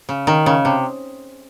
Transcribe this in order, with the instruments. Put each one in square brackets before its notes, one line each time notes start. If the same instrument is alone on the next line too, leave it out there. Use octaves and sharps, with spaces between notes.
[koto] C#3
D#3
C#3
C3